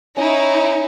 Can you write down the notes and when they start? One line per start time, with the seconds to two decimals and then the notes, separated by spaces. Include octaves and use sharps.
0.17 C#4 D#4 E4